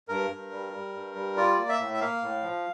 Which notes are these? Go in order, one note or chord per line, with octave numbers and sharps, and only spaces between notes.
G2 A#4
G2
G3
G3
G2
G3
F4 D5
A#3
E5
A2
E5
A#3 F5
A2
F3